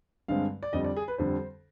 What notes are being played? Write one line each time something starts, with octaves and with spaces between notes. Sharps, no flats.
G2 D3 G#3 C4 F5
D5
F2 D3 G3 C4 D#5
D5
G#4
B4
F2 D3 G3 C4 C5